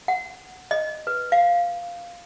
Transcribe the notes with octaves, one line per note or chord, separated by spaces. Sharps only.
F#5
D#5
B4
F5